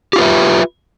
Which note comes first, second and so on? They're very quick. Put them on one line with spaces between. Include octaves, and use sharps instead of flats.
G4 F4 B4 E5